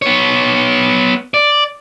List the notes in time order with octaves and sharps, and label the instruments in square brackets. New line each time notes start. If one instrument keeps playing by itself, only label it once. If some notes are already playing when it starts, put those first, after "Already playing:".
[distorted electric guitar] B3 C#5
D5